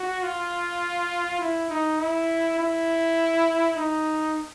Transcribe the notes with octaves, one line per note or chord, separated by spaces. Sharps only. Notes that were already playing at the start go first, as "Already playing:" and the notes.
Already playing: F#4
F4
E4
D#4
E4
E4
D#4